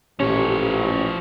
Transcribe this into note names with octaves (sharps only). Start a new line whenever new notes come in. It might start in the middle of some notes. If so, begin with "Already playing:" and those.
A1 A#2 F3 C#4 G4 C#5